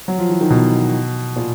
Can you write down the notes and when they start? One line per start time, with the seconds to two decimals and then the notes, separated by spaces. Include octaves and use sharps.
0.08 F#3
0.18 F3
0.29 E3
0.41 D#3
0.50 B2
1.36 A#2